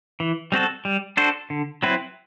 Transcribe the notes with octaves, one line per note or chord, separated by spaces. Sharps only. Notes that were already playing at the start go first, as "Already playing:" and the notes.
E3
G3 C4 F#4 A4
G3
D4 F#4 A4 C5
D3
F#3 C4 E4 B4